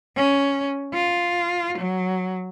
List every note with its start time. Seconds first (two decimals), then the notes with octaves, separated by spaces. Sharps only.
0.16 C#4
0.93 F4
1.78 F#3